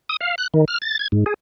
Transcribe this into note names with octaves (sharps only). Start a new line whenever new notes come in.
D#6
F5
F#6
D#3
F6
A6
G#6
G#2
G#4